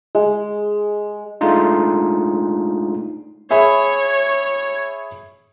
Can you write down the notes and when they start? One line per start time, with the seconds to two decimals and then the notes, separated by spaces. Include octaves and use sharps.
0.15 G#3
1.41 G#3 A3 D4 D#4 F4
3.50 G#4 C#5 E5 B5